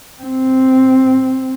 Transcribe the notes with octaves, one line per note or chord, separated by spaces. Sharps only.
C4